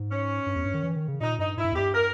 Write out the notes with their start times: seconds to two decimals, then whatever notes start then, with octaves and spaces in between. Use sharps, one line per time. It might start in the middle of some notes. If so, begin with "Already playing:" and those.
Already playing: G#2
0.10 C#4
0.46 G2
0.56 E2
0.65 G2
0.74 D#3
0.84 E3
0.96 D#3
1.08 C#3
1.21 A#2 D#4
1.39 G2 D#4
1.57 G#2 E4
1.65 G2
1.72 E2
1.75 G2 G4
1.94 A#4